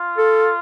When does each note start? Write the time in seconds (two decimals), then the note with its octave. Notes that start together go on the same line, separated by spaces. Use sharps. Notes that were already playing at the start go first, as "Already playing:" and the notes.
Already playing: F4
0.18 A4